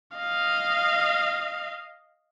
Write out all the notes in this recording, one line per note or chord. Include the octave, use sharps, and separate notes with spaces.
D#5 F5